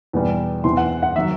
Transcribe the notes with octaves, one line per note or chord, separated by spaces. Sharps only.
E2 B2 G3
E2 C3 E3 B3 C6
F#5
F#5
D#3 F#3 C4 E5